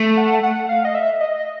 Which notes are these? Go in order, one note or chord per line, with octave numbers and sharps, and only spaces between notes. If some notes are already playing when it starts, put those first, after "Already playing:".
Already playing: A3
F#5
F#5
F5
D#5
E5
D#5